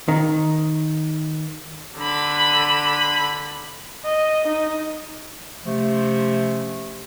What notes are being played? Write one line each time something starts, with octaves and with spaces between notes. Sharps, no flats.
D#3
D3 B5
D#5
D#4
C3 F3 A3 C#4